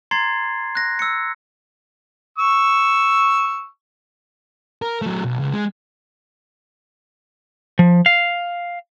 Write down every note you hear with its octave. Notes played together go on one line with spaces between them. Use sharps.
A#5 C6 G#6 A6 C7
F#6 A#6
E6 C#7
C#6 E6
A#4
F#3 A3
B1
C#2
G#3
F3
F5